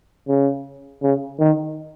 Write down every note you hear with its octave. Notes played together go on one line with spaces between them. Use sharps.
C#3
C#3
D#3